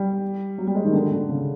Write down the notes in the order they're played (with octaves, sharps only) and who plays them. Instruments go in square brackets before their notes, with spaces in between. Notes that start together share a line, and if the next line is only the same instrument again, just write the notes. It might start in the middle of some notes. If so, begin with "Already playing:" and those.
Already playing: [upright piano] G3
F#3
G3
G#3
D#3
D3
D3
C#3